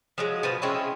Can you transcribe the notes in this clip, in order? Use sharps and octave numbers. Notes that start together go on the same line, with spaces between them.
F3 F#3 G#3
B2 F3 B3
G#3 C4 C#4 E4